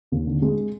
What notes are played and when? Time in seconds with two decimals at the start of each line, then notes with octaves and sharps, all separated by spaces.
0.12 D#2
0.27 D3
0.42 G#3